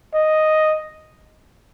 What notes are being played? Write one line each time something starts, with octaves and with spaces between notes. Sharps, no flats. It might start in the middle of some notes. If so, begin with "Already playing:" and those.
D#5